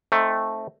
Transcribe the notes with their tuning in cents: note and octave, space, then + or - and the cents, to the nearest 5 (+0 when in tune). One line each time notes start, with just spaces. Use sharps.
A3 +0 C4 +25 D#4 +5